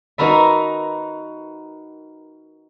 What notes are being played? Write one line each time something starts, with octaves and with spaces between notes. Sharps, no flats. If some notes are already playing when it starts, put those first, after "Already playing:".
D#4 F#4 A#4 B4 E5